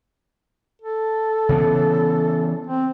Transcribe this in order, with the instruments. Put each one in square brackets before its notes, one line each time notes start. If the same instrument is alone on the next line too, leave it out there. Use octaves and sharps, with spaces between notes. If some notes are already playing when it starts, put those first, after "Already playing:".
[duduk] A4
[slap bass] C#3 E3 B3
[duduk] C4